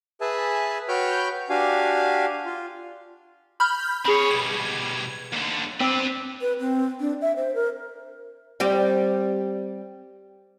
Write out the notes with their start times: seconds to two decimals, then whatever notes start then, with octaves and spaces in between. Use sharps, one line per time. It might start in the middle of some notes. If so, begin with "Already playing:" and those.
0.21 G#4 B4 E5 G#5 A5
0.88 F#4 B4 C#5 G5 F6 G6
1.50 D4 F#4 G4 F5 G#5
2.45 F4
3.60 B5 F6 G6
4.05 C4 G#4 C#5 B5
4.30 B2 G3 G#6
5.32 D#2 D3
5.80 C4 D4 B4
6.41 B4
6.59 C4
7.00 D4
7.21 E5
7.36 C5
7.55 A#4
8.60 G3 C4 G4